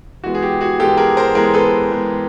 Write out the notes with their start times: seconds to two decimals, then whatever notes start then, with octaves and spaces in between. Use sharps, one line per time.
0.23 E3 G#3 B3 F#4
0.35 G#4
0.43 G4
0.61 F#4 G#4
0.79 E3 G#3 B3 G4 A4
0.97 G#4 A#4
1.17 A#4 C5
1.35 E3 G#3 B3 G#4 A#4
1.54 A4 B4
1.91 E3 G#3 B3